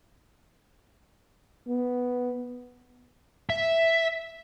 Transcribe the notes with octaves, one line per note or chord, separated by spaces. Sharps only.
B3
E5